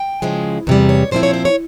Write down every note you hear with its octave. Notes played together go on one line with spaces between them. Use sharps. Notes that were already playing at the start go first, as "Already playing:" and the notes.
Already playing: G5
C#3 F3 G#3 E4
E2 C3 G3
C#5
A#2 F3 C4 E4 C5
C#5
C5
C#5